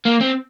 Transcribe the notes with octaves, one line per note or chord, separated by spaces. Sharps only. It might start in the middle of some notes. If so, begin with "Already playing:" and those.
A#3
C4